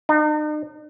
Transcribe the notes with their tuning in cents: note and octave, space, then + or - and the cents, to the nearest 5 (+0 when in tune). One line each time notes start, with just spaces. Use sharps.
D#4 -45